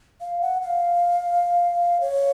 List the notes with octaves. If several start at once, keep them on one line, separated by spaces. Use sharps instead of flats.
F5
F#5
F5
C#5